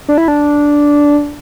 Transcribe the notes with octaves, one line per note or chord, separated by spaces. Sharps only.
D4
E4
D4